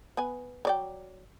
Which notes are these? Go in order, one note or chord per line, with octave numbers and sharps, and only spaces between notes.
B3 B4 G#5
F#3 D5 G5